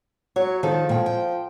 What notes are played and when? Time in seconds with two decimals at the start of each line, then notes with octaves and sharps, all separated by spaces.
0.36 F#3 C#5
0.63 D#3 F3 A4
0.89 A#2 G5
1.06 G5